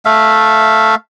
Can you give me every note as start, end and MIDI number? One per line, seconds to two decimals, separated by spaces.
0.05 0.95 57
0.05 0.95 76
0.05 0.95 77